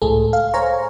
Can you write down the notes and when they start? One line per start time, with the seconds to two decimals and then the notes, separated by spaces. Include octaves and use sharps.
0.02 C#2 A2 G#4 A4
0.33 F5
0.54 C5 C#5 F5 G#5 A#5 C#6